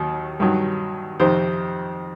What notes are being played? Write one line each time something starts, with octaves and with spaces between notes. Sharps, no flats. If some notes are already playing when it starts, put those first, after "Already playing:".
Already playing: D#2 D#3 F#3
G2 D#3 F#3
F2 C3 D#3 C5